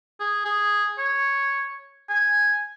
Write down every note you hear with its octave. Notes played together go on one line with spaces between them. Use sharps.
G#4
G#4
C#5
G#5